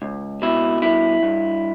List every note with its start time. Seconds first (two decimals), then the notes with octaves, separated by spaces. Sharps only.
0.02 C#2
0.42 B2 E4
0.82 G2 E4
1.23 G2